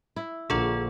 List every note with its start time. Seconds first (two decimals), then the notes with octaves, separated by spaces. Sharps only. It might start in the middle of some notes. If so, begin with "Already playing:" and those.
0.16 E4
0.50 A#1 D3 A#3 F4 G#4